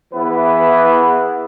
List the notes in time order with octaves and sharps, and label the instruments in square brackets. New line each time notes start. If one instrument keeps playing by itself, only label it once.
[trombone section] E3 B3 E4 G#4 B4